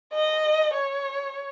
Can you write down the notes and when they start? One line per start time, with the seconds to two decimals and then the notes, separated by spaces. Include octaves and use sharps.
0.13 D#5
0.74 C#5